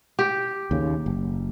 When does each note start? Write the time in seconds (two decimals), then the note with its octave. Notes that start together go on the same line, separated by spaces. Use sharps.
0.19 G4
0.71 D#2 C#3
1.06 F#1